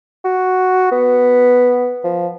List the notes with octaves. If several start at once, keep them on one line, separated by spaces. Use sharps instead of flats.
F#4
B3
F3